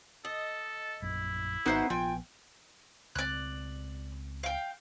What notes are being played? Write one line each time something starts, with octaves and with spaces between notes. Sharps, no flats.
A4 D#5
A#1 F#2 E4
G#1 B3 D#4 F#4 B4 C5 E5
A#1 F3 B3 F4 G5 G#5
C#2 C4 D5 F#6
F5 G5